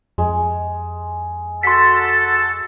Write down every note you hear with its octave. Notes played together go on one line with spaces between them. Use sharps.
F2 G#3
F#4 A4 C6 B6